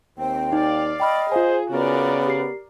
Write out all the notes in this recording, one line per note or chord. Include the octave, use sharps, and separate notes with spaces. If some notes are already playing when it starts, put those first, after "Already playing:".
D#2 C4 G5
D#4 D5 F5
D#5 G5 B5 F6
F4 G#4 C5 F5 G#5
C#3 B3 F#4 A#4 D5
G4 C7